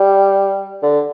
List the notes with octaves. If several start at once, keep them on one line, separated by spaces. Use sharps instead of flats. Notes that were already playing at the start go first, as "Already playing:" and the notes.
Already playing: G3
D3